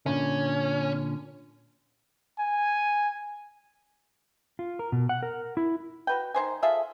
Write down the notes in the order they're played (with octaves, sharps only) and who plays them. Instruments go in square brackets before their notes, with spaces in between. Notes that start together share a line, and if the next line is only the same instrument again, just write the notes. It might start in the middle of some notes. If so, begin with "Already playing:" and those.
[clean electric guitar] A#2 D3 [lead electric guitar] C#4
[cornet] G#5
[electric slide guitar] F4
A#4
B2
F#5
A#4
E4
[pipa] F#4 B4 G5
D#3 C#4 C5 G#5
F4 G#4 A4 E5